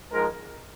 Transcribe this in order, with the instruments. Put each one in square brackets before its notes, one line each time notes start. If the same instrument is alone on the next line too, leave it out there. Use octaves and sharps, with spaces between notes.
[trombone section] G#2 F3 G#3 A#4